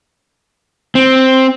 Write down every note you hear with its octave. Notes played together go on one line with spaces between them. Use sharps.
C4